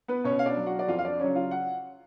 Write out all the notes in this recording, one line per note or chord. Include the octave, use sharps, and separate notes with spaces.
B3 B4
B2 C#4 C#5
F5
D4 D5
F#3
F#4 F#5
D5
F2 F4 F5
F5
D4 D5
C#3 F#3 C#4 C#5
F4 F5
F#5